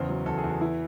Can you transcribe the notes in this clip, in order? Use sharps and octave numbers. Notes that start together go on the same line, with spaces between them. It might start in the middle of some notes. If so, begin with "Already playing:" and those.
Already playing: E2 C#3 C5
F#3
E2 A4
G#4
E2
F#4
E3 E4